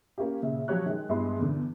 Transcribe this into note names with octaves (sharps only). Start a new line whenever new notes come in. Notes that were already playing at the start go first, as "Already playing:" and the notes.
A#3 C#4 F4 G4
A#2 C#3 E5
F3 F#3 G4 C#5 F#6
D#3 G#3
G2 G#3 B3 E4 C6
E2 D3